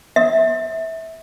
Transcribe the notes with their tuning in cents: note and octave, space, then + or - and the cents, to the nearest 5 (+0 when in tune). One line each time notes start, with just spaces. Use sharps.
E5 -20